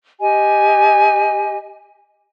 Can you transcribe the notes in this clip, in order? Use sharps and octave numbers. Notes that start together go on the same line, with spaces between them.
G4 D#5 G#5